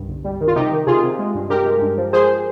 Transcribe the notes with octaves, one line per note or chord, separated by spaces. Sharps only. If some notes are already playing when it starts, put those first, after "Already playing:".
Already playing: C2 G2
G1
G3
D#3
F4
C3 D#4 G4
D#3
C3 F4 G#4
C3
G#3
G2
G2 G4 A#4
G#3
G2
F3
F3 G#4 C5